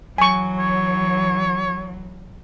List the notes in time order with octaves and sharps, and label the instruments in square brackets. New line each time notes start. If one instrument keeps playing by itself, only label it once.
[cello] E3 F#3 [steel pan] G#5 C#6
[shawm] C#5